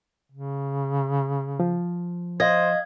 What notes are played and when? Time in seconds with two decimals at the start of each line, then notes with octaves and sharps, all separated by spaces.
0.32 C#3
1.60 F3
2.40 C5 D#5 F5 G#6